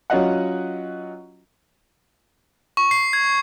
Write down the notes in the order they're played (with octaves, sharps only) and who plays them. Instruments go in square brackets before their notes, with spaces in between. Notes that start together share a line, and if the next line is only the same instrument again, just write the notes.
[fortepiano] F#3 C#4 F4 D#5 F#5
[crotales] C#6
C7
G#6